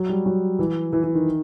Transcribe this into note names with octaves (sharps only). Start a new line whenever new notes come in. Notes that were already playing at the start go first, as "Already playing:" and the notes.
Already playing: F#3
G3
F#3
E3
E3
E3
D#3